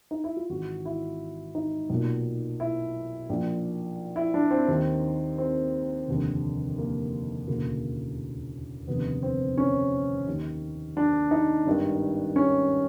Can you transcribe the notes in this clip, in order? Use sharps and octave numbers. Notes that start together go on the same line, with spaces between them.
D#4
E4
F4
G#1 G#2 E3 F#4
E4
D#4
B1 A#2
E4
A#1 A#2
E4
D4
C4
D#2 D#3
C4
F1 D#2 D3
A#3
E1 D2 C#3 E3 A#3
F1 D#2 D3 B3
C4
C#4
D#2 D#3
D4
D#4
G#1 G2 D#3
C#4